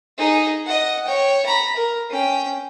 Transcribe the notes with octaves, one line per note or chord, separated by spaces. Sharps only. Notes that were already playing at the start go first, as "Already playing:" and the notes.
D#4 G#4
D#5 F#5
C#5 G5
A#5 B5
A#4
C#4 G5